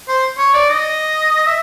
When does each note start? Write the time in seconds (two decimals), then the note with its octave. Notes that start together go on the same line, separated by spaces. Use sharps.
0.08 C5
0.38 C#5
0.54 D5
0.69 D#5
1.46 E5